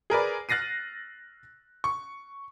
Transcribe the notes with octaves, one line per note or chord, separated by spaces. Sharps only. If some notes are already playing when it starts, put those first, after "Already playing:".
G#4 A#4 B4 D5
F6 F#6 A6 A#6 C7 D#7
C#6